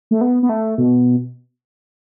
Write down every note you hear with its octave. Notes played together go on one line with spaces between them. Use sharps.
A3
B3
B3
A3
B2